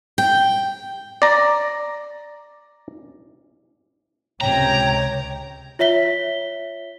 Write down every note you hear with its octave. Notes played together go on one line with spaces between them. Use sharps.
G5
D5 A#5
C#2 C3 C#5 G5 A#5
F4 C#5 E5 B6 G7